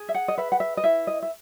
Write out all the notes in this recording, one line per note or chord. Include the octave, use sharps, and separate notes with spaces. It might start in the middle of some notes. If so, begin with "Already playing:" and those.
Already playing: G#4
E5
F#5
D#5
B4 E5
F#5
E5
D#5
E4 E5
D#5
E5